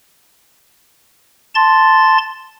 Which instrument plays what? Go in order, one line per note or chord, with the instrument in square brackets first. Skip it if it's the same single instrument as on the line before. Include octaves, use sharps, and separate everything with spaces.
[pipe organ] A5 C6 A6